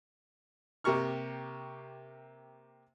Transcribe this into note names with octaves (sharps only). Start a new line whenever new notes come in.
C3 A#3 G4 A#5 C#6 F6